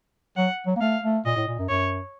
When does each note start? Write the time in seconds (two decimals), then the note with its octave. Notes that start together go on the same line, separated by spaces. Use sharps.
0.37 F#3 F#5
0.67 F#3
0.76 A#3
0.81 A3 F5
1.03 A3
1.25 A#2 D#5
1.37 A2
1.48 A#2
1.59 F#2
1.69 F#2 C#5